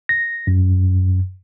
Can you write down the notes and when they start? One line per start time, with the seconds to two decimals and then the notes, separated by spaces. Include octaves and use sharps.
0.09 A#6
0.47 F#2